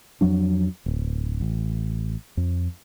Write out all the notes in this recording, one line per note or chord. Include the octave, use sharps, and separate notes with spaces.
F2 F3 F#3 D4
D1
A1
F2